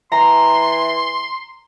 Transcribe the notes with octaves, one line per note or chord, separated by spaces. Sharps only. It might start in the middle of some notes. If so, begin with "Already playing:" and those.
E3 A#5 C6